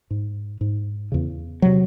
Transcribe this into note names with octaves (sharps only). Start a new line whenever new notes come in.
G#2
G#2
E2 C#3
C3 F#3